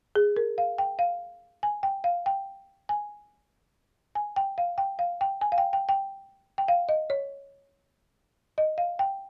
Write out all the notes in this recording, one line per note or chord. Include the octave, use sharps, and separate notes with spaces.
G#4
A#4
F5
G5
F5
G#5
G5
F5
G5
G#5
G#5
G5
F5
G5
F5
G5
G#5
F5
G5
G5
G5
G5
F5
D#5
C#5
D#5
F5
G5